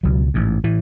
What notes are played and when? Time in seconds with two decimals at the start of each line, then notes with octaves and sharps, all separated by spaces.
0.03 C#2 B2 F#3
0.34 A1 G#2
0.64 A2 E3